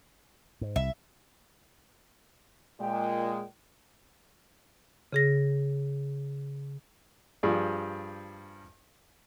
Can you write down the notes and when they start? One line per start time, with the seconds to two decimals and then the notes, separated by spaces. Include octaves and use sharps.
0.61 G#2
0.76 C2 E5
2.80 A#2 G#3 G5
5.13 C#3 G#4 A#6
7.43 G2 F3 G#4 D5